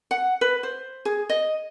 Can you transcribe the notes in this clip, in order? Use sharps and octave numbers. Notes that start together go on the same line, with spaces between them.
F#5
B4
C5
G#4
D#5